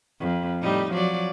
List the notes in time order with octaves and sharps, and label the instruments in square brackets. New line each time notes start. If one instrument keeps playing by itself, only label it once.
[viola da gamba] F2
A2 G3 D#4
F3 F#3 D5